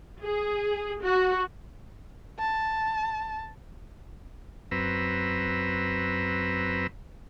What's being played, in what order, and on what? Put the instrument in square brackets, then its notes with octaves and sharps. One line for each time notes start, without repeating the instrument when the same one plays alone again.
[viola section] G#4
F#4
[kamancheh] A5
[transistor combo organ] F#2 C4 B4 A#5 E6